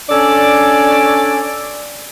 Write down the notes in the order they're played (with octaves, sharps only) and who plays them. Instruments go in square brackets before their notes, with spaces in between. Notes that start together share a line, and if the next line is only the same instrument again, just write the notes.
[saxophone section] C#4 D4 A4 D5